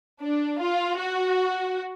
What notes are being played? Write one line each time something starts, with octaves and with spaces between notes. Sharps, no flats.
D4
F4
F#4